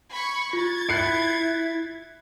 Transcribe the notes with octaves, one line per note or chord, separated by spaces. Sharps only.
B5 C#6 G#6
F4 G#6 A6
E4 F#6 C7 C#7